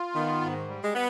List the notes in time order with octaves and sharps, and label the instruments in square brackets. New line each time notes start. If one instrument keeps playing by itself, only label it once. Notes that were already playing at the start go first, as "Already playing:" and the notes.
Already playing: [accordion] F4
[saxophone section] D#3 [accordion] B3
[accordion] G#2
G3
[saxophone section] G#3
B3